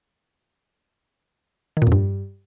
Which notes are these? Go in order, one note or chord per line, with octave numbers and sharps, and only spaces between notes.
D#3
A#2
F2
G2